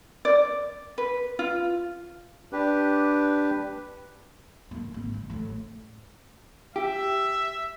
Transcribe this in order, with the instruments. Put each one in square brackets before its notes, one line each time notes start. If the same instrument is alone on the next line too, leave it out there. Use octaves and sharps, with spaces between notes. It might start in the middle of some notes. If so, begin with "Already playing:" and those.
[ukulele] D5
B4
F4
[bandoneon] D4 G4 B4
[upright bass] A3 A#3
G#1
D#3
A1 A2
[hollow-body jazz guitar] G4 [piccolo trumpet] E5